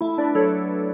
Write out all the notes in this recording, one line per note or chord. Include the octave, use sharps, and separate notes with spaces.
A3 E4
D4 B4 D5
F#3 A4 C#5